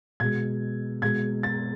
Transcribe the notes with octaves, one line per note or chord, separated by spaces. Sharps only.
B2 G#3 G#6
B2 G#3 G#6
A6